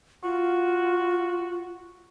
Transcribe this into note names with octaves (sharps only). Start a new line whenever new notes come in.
F4 F#4